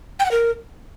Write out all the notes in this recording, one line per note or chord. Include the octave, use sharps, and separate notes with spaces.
G5
F#5
A#4